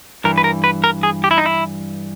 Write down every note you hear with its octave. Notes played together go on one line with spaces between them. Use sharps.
G2 E3 A#4
B4
A#4
B4
A#4
G#4
G4
E4
D#4
E4